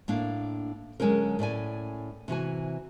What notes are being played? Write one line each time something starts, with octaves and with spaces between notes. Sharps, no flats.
A2 A#3 D4 F5
D3 F#3 G#3 C#4 D#4 A#4
A2 C#4 D5 G#5
C3 E3 F#4 G#5